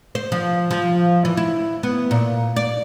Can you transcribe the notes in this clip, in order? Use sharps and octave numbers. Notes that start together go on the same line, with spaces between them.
C5
F3
F3
E3
E4
B3
A#2
D5